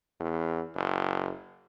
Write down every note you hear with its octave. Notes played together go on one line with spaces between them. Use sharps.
E2
F#1